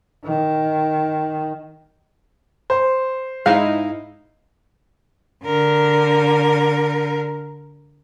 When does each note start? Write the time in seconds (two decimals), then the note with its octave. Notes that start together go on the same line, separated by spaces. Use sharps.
0.25 D#3
2.70 C5
3.46 G#2 D#4 E4 F5
5.44 D3 A#4